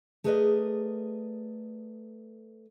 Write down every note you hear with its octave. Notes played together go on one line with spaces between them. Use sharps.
A3 G#4 A#4 B4 D5 D#5